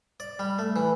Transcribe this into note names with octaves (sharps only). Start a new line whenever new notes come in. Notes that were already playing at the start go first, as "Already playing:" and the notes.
D5
G3
A3
E3